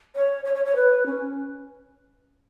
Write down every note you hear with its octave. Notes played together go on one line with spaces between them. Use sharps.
C#5
C#5
C#5
C#5
B4
C#4